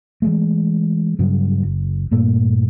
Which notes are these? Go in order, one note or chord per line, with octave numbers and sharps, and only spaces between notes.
E3 G#3 A3
G2 C#3 F#3
F#1
G2 A#2 A3 A#3